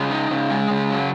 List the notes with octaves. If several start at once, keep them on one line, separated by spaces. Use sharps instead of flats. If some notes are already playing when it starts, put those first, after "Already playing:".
Already playing: C#3 D#5
D#4
C#3
G#3
C#3
F#3